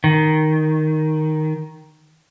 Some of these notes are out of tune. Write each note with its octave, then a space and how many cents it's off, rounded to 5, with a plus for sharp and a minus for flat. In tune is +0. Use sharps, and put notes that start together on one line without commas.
D#3 +0